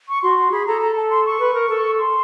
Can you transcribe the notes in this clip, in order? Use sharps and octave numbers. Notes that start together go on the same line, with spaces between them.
C#6
F#4 C6
G#4 B5
A4 A#5
A#5
A5
C6
C#6
B4
A#4
A4
C6